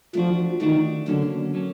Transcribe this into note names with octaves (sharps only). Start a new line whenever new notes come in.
F3 A3 D4 F#4
D#3 A3 D4 F#4
D3 F#3 A#3 C#4 F#4 A4
F#3 A#3 C#4 F#4 A4